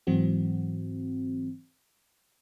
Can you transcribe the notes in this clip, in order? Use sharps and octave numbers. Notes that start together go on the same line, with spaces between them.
G#2 E3 F#3 C4 F#4